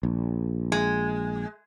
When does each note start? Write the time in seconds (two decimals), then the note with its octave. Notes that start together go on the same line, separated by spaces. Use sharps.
0.03 A#1
0.72 G#3